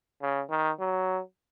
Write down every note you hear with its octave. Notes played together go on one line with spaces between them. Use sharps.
C#3
D#3
F#3